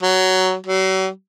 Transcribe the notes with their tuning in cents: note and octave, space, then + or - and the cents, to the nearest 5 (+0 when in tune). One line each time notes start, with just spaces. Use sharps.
F#3 +10
F#3 +40